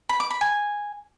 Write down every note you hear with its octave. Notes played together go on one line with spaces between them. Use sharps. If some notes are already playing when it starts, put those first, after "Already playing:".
B5
D6
B5
G#5